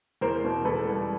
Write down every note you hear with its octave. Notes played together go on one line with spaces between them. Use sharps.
E2 A#4 C5
B2
E2 A4 B4
G3